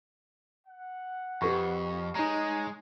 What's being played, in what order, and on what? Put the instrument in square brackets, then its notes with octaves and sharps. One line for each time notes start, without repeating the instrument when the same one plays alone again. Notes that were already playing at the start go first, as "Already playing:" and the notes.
[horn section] F#5
[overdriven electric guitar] F2 [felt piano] G4 B4 C#6
[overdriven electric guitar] G#3 [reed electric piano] D#4 A#5 [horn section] C#5 D#5 G#5